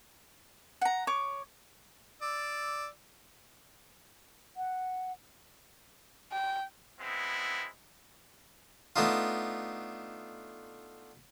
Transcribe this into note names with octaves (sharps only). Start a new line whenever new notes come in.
F#5 A#5
C#5 D6
D5 E6
F#5
G5
G#3 B3 C4 E4
A3 B3 D4 D#4 F4